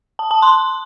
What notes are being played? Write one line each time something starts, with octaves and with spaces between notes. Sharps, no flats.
A5
A5
C6